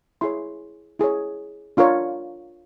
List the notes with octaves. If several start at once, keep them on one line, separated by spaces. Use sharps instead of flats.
E4 G#4 C#5 C6
E4 G#4 C#5
D4 F4 A#4 C#5